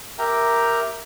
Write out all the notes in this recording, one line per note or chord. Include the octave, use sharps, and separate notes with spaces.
G4 A#4 E5 G5 A#5